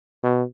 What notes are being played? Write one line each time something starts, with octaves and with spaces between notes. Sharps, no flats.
B2